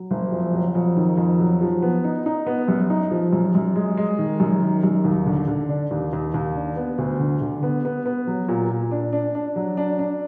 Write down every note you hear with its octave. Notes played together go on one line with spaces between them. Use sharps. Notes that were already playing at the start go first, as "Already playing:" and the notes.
Already playing: F#3
F#1
F2
F#3
F2
D#3
F2
F#3
F3
B3
D#4
D#4
B3
F#2
D#4
F3
F#2
F#2
G#3
G#3
D#3
F#2
D#3
F#2
D#2
D3
D3
D4
D#2
D#2
D#2
D4
B3
D2
D3
D3
B3
B3
B3
F#3
A#2
A#2
D4
D4
D4
F#3
D4
D4